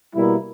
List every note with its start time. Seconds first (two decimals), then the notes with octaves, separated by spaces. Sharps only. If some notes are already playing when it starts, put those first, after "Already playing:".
0.15 B2 G3 A#3 E4